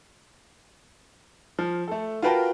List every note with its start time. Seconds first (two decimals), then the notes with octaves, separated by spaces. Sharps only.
1.59 F3
1.88 A3 A4
2.22 F4 F#4 A#4 B4 G5 A5